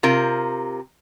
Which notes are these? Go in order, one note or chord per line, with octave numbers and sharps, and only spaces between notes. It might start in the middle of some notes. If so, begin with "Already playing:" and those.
C3 F4 A#4